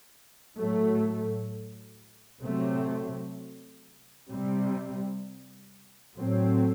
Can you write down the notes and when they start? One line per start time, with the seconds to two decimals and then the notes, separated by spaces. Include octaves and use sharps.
0.57 A2 F#3 A3
2.42 C3 F#3 A3 C4
4.30 C3 G3 C4
6.16 A2 F#3 A3 C4